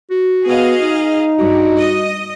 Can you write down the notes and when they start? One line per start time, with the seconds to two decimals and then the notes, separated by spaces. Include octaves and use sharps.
0.10 F#4
0.47 B3 G#4 D#5 F5
0.82 D#4
1.38 G2 F#4
1.78 D#5